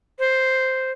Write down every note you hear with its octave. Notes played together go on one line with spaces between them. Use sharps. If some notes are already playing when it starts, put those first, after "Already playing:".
C5